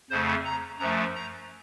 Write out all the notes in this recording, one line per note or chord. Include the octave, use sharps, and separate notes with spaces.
F2 C#3 A3 C5
A#5
F#2 F3 A3 A#5
A#5